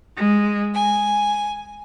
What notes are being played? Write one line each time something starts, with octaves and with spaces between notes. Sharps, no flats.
G#3
G#5